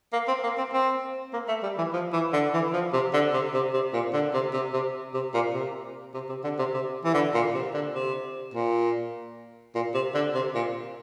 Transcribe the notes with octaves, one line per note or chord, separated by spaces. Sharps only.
A#3
C4
A#3
C4
C4
A#3
A3
G3
E3
F3
E3
D3
E3
F3
C3
D3
C3
C3
C3
A#2
D3
C3
C3
C3
C3
A#2
C3
C3
C3
D3
C3
C3
E3
D3
A#2
C3
D3
C3
A#2
A#2
C3
D3
C3
A#2